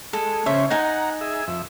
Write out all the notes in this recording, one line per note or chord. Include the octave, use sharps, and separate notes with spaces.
G#3 A4
C#3 C#4 C5 E5
D#4 F#5 G#5 A#5
G#4 E5
F2 E5